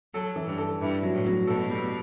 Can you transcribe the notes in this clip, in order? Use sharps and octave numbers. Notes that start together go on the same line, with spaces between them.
F#3 A4
E3
G2
A4
G2 E4
F#3
A2
F#3
B2 A4
G3